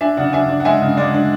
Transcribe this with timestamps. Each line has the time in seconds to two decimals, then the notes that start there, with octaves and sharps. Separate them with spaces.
0.01 D4 E5 G#5
0.17 C#3 D5 F#5
0.33 D4 E5 G#5
0.49 D4
0.60 F#5
0.65 G#3 E5 G#5
0.82 C#3
0.97 G#3 D5 F#5
1.14 D4